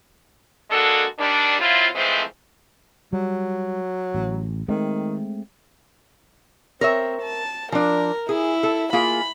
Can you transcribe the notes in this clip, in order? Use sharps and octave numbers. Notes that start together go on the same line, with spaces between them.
G#3 A#3 D4 F#4 A4
D#3 G3 D4
F#3 C4 E4 F4
E3 F3 G#3 A3 C4
F#3 G3
A1
D#3 G#3 A3 C4
C4 A#4 C#5 E5
A5
F3 D4 A#4
E4 G#4
A4
A#3 F4 G#4 B5